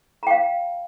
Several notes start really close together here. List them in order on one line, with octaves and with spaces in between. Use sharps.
A#5 G5 F5